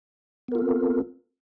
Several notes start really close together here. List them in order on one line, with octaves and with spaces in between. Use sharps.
B3 A#4 F4 A4 C4